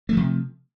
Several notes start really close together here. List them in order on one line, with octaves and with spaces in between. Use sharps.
A3 F3 C3